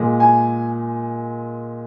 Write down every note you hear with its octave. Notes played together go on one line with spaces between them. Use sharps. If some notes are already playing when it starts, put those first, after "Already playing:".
Already playing: A#2 G#3
G#5